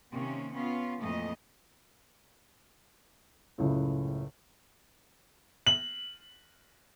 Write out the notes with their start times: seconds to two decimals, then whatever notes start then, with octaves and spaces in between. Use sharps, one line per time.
0.12 C3 D#3 A#3 C#4
0.52 B3 C#4 F4
1.01 F2 A#2 E3 A3 D#5
3.58 F#1 C#2 A2
5.67 F#7